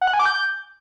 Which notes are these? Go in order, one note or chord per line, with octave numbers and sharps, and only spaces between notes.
F#5
F#6
G#5
D6
G6